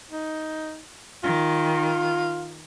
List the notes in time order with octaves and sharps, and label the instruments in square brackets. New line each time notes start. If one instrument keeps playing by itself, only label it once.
[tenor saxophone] D#4
[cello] D#3 [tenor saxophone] F4